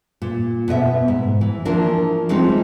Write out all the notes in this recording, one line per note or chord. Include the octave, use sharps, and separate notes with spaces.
A#2
B2 B3 D#5 E5
G#2
E3
E3 F3 A#3 D4 A#4
E3 F3 G#3 C4 C#4 D#4